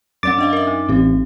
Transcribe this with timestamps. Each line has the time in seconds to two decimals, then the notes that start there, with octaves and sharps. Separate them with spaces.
0.23 F#2 C#4 D5 D6 A6 D7
0.38 D4 D#5 F5
0.53 A#4 E5
0.67 D#4
0.89 A1 C4 G4